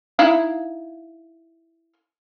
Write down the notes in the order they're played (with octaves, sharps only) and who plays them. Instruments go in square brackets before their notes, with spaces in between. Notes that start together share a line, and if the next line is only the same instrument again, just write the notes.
[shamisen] D#4 E4 F5